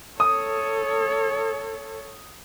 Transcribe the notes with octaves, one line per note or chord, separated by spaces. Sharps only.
A4 C#5 D#6